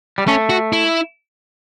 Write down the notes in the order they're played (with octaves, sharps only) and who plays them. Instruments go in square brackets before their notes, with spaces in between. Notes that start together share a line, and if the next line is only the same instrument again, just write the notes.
[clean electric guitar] G3
[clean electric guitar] A3 [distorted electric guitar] C#4
[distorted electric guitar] F#4
E4